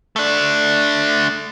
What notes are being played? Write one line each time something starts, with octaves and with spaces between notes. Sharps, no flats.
A3 D4